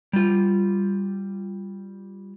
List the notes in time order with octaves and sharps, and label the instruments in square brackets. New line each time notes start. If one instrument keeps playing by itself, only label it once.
[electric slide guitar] G3 F4